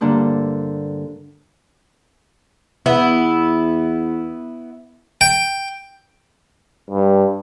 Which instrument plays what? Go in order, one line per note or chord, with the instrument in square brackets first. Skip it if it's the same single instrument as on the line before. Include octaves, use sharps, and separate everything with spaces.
[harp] G2 D3 A#3 D4 C5
[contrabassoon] E2 [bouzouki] B3 E4
[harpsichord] G5
[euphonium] G2